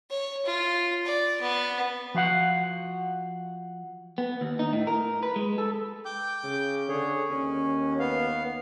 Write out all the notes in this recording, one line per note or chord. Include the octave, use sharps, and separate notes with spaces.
C#5
F4
D5
B3
F3 F#4 F5 F#5
B3
D#2
D#4
A2
A#4
B4
G#3
A4
G5 D6 G6
C#3
D3 G#4 C#5
D#2 C#4
B3 F5